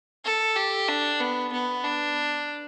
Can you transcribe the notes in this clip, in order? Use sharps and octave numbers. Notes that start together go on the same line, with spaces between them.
A4
G4
D4
B3
B3
D4